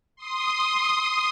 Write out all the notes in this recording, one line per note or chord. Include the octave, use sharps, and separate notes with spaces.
C6 D#6